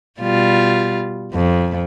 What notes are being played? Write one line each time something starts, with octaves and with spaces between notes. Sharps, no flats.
B2 G3 F4
F2